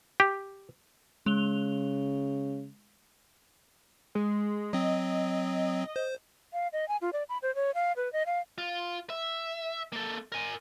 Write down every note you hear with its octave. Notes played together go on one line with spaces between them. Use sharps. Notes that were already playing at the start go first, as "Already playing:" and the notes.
G4
C#3 G#3 F7 G7
G#3
F#3 C4 D#5
C5
F5
D#5
G#5
F4
D5
B5
C5
C#5
F5
B4
D#5
F5
F4
E5
A#3 A4
A#4 G#5